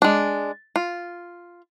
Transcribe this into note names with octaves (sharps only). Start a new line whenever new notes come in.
G#3 D4
F4